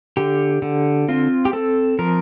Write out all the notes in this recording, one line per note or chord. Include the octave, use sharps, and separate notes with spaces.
D3 G4
D3
C4 F4
G4
C4 A4
F3 A#4